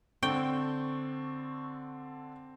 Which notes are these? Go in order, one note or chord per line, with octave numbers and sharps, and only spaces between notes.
D3 C4 D4 A4 G5 C#6